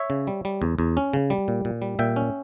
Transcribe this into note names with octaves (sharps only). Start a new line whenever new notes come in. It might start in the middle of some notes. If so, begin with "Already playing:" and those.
Already playing: C#5 E5
C#3
G3
G3
E2
E2
C#4
C#3
G3
A#2
A#2
G3
A#2 E5 G5
C#4